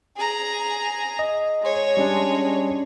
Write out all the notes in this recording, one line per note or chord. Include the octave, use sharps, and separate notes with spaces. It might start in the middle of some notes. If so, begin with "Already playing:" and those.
G#4 A#5
D#5
G#3 C#5
G3 C#4 D4